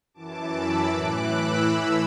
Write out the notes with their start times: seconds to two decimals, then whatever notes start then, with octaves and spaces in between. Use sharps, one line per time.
0.14 F#2 E3 A5 D6
0.51 B5 E6
0.88 A2 E3 D6 F#6
1.26 B5 E6
1.63 A2 E3 B5 E6